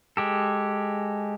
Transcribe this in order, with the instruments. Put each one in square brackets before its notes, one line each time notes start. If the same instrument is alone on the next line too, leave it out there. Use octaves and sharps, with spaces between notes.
[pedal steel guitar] G#3 G4 A4